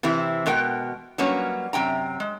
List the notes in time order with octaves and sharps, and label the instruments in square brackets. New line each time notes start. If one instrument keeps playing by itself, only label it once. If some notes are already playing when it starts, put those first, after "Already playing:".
[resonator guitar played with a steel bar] C3 E3 C4 E4
B2 G#3 A#4 G5
F#3 G3 A#3 C#4 B4 C#5
F#2 C3 G5 A#5
G#3